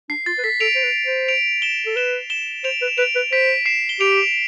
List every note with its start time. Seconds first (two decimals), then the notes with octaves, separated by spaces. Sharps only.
0.09 D4 C7
0.26 F4 A6
0.38 B4
0.44 A4 B6
0.60 A4 D7 F7
0.75 C5
0.83 B4
1.06 C5
1.28 D7 F7
1.62 E7 G7
1.86 A4
1.96 B4 E7 G7
2.30 E7 G7
2.64 C5 D7 F7
2.82 B4
2.88 E7
2.98 B4 D7 F7
3.16 B4
3.32 C5 B6 D7
3.66 C7 E7
3.89 G7
4.00 G4 D7 F7